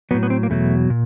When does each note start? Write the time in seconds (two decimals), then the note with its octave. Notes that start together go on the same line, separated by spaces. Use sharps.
0.11 A2 F#3 B3
0.23 B3
0.30 C4
0.43 A#3
0.50 E2 B2 F#3 A3
0.90 A#2